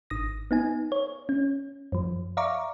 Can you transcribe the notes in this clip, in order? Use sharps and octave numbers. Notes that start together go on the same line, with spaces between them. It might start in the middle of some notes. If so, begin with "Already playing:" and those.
G#1 D#6 A#6
B3 D#4 G#5
C#5
C#4
F#2 F3
D5 E5 F5 A#5 C#6 D6